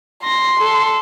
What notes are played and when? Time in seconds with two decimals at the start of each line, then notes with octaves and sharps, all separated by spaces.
0.24 C6 A#6
0.59 A4